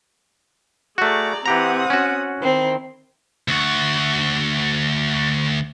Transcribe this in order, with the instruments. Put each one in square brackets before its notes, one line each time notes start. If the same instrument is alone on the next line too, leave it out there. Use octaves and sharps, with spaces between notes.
[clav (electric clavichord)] A3 F#4 [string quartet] G#4 D5 A#5
[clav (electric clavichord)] E3 G4 A#5 [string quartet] C4 F#5 D#6
[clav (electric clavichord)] C#4 F#4
[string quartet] D#3 C4 E4
[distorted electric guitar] D2 F#4